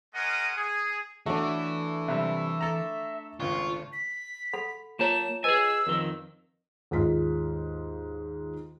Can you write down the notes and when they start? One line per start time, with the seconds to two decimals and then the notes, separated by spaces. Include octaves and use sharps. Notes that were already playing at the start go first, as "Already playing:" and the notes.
0.15 G#3 C#4 A#4 D#5 F#5 D#6
0.57 G#4
1.26 E3 A3 D4 F#4
2.08 C3 G3 E5
2.61 A4 A#5
3.40 G#1 C#2 A#2 F4 C#6
3.93 B6
4.53 A4 F#5 B5
4.99 A#3 F4 C#5 A5 A#5 E7
5.44 G#4 B4 D#5 G#5 E6
5.87 F2 D#3 A#4
6.91 D#2 G#2 F4 B6